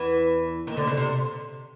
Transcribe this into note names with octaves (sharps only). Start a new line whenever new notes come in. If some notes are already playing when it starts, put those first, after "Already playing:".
Already playing: E2 E3
D#2 D#3
D2 D3
C#3
C3